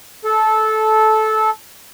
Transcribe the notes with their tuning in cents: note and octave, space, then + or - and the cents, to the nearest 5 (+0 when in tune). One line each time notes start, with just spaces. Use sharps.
A4 -15